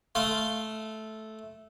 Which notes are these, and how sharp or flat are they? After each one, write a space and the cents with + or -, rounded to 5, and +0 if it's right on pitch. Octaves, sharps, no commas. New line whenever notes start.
A3 -10 F5 -20 C6 -10